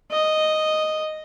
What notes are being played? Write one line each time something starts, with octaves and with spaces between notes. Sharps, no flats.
D#5